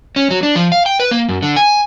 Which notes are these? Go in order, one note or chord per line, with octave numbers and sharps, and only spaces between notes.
C#4
F#3
D4
F3
F5
G5
B4
A#3
F#2
D3
G#5